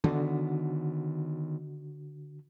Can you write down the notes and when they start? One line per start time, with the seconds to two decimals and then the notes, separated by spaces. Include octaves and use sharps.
0.04 D3 D#3 B3 F#4